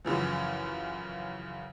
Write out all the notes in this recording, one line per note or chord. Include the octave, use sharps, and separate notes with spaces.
F#2 C#3 E3 F3